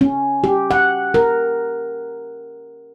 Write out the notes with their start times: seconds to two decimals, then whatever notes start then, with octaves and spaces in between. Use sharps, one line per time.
0.01 C#4
0.44 G4
0.71 F#5
1.14 A#4